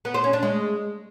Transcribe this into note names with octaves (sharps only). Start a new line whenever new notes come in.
B3
C5
C#4
D4
G#3